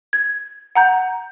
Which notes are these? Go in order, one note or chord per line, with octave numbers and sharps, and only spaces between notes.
G#6
F#5 A#5 G6